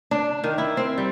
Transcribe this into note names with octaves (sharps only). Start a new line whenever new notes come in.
D4
D#3
E4
C4
G3